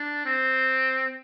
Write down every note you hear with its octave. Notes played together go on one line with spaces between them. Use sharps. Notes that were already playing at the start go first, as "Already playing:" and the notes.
Already playing: D4
C4